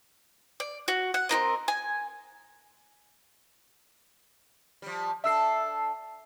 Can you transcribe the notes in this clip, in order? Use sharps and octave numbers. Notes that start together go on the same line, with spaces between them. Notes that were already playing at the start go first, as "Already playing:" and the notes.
D5
F#4
F#5
C4 D4 A#4 D#5
G#5
F3 G3
D4 A4 E5 E6 C7